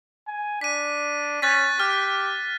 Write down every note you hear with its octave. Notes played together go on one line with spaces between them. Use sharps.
G#5
D4 B6 D#7
C#4 F#6 A6 B6
G4 F6